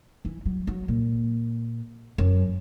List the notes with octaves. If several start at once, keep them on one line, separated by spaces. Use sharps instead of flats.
E3
F#3
F#3
A#2
F#2